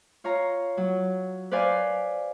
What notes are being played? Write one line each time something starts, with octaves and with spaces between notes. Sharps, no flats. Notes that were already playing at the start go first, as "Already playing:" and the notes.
F4 C#5 F5 A#5
F#3
B4 C5 D5 F5 G#5